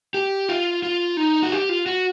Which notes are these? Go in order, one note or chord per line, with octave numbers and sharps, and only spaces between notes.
G4
F4
F4
D#4
F#4
G4
F4
F#4